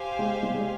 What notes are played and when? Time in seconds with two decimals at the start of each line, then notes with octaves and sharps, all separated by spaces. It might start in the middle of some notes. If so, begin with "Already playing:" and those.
Already playing: G4 C5 F5 G#5
0.19 G#3
0.43 G3
0.54 G#3